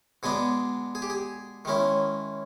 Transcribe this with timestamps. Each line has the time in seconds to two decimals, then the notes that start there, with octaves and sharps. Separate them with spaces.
0.23 B2 G#3 B3 D4 G#4
0.95 G#4
1.02 G4
1.10 G#4
1.65 D#3 G#3 C#4 E4